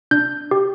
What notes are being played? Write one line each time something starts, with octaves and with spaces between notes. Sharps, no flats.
D4 G6
G4